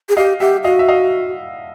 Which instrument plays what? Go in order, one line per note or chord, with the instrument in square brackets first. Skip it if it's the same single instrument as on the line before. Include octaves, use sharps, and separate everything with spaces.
[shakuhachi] G#4
[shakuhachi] G4 [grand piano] D#5 F5
[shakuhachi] G4 [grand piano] E5 F#5
[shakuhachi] F#4 [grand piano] D#5 F5
[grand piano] E5
D#5 F5